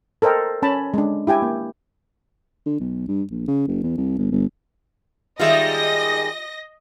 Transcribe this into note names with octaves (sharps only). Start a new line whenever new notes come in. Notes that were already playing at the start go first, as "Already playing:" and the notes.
A4 A#4 C5 D#5 G5
C#4 A5 B5
G#3 D4
E4 G4 G5 G#5
A#3
D3
B1
G2
A#1
C#3
F#1
E2
C2
G1
G1
D#3 G3 G#3 F4 G4 D#5 E5 A#6